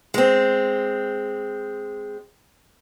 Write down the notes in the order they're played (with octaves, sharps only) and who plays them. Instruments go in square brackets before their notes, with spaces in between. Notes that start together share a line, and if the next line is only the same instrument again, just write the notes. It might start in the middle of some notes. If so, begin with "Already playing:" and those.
[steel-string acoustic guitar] G#3 C4